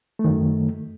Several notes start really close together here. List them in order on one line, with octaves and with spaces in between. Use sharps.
A3 D#3 F#2